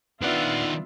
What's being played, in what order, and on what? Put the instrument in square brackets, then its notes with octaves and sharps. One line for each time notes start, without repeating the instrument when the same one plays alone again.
[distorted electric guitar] D#3 F#5 [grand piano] B3 D4 [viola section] F4 E5